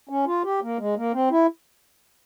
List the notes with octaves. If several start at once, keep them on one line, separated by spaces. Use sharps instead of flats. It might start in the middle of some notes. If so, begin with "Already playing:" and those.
C#4
F4
G4
A#3
G#3
A#3
C4
E4